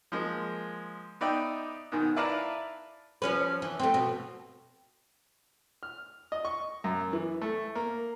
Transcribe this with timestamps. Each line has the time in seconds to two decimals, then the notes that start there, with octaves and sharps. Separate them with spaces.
0.12 F3 G#3 A#3
1.21 B3 D#4 D5 E5 G5
1.92 G#2 B2 D#3
2.16 E4 B4 D5 F5 A5 A#5
3.22 F3 C#4 B4
3.62 E3
3.79 A3 C4
3.94 B2
5.83 F6
6.32 D#5
6.45 C#6
6.84 F#2
7.13 E3
7.41 A3
7.75 A#3